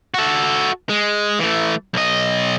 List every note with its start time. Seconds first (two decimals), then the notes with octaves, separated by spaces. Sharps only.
0.14 F#4 A4
0.89 G#3
1.39 E3 A3
1.94 B1 D#5